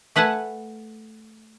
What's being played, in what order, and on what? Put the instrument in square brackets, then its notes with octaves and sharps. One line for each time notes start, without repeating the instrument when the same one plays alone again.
[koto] A3 B4 F#5 G#5 A5